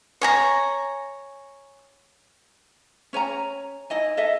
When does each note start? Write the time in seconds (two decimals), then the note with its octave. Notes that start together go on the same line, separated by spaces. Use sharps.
0.21 C#5 G#5 A#5
3.13 C#4 C#5 G#5 A#5
3.90 D#4 E4 D#5 G#5
4.17 A4 D#5 E5